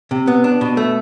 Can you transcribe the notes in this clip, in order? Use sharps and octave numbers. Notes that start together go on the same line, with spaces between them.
C3
B3
D4
B2
A3